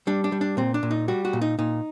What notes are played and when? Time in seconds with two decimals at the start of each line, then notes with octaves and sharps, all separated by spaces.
0.07 G3 D4
0.24 D4
0.32 G3
0.41 D4
0.57 A#2 C4
0.74 D4
0.83 A#2
0.91 D#4
1.08 G3 F#4
1.25 F#4
1.33 A#2
1.41 D#4
1.59 A#2 D#4